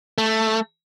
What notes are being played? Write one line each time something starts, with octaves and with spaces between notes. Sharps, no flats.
A3